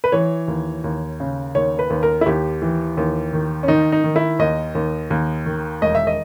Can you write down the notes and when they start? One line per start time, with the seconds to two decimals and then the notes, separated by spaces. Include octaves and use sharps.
0.04 B4
0.12 E3 C#5
0.48 D#2
0.84 D#2
1.20 C#3
1.55 D#2 C#5
1.79 B4
1.90 D#2
2.03 A#4
2.21 E4
2.26 D#2 G4
2.62 E3
2.97 D#2
3.33 D#3
3.63 C#4
3.68 D#3 D#4
3.92 D#4
4.04 D#3
4.16 E4
4.39 D#2 D#5
4.75 D#2
5.10 D#2
5.46 D#3
5.82 E1 D#5
5.95 E5
6.07 D#5